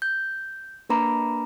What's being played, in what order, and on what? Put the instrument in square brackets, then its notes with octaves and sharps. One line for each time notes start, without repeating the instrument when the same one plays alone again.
[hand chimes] G6
A#3 D4 B4 A#5 B5 D6